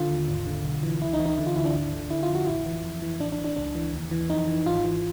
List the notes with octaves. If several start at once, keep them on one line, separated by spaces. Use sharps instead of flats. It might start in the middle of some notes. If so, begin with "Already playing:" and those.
Already playing: D3 F4
D#2
G#1
D3
B1
E3
C#2 E4
D#4
E3
D#4
D3 E4
F4
D2 E4
D4
G#1
D3
D3 E4
F4
F2
F#4
A1 E4
E3
F2
E3
A1 D4
D4
E3
D4
C#2 D4
E3
D#2
E3
F2 D#4
E3
G#1 F4
E3